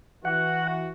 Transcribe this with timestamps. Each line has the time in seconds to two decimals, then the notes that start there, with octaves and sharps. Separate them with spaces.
0.25 E3 F#4 F#5